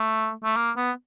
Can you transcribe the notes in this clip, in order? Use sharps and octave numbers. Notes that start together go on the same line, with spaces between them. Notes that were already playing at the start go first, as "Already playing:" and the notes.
Already playing: A3
A3
A#3
B3